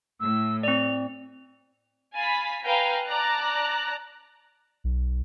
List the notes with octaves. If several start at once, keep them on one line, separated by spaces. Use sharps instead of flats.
A2 E6
C4 D5 F7
F5 G#5 B5 A6 B6
B4 F5 G5 G#5 A#5
D5 A5 A#5 F#6
B1